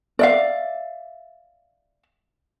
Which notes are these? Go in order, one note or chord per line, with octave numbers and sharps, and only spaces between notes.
D5 E5 F5